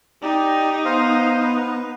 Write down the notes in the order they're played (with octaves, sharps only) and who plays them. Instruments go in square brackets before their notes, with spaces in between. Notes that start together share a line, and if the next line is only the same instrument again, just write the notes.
[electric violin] D#4 [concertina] G4 D5
[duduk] B3 [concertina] C5 F5
[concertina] B4